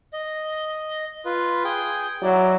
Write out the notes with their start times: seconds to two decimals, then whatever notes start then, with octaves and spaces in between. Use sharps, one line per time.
0.13 D#5
1.25 F4 B4
1.65 G#4 G5
2.23 F#3 E4 D5